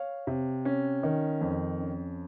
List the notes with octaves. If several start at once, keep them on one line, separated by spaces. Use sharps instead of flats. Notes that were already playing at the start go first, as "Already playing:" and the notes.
Already playing: C#5 F5
C3
C#4
D#3
F2
C#4